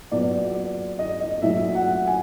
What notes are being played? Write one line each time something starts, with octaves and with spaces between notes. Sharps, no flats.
A#2 F#3 B3 D5
D5
D#5
D#5
A#2 F#3 A3 E5
F#5
G#5